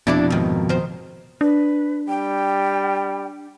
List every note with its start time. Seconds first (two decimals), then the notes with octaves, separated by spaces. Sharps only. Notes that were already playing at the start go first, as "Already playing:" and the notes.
0.07 F1 F2 B2 D4 E4 D5
0.30 G#2 D#3
0.69 D#3 C5
1.41 D4 B4
2.08 G3 G5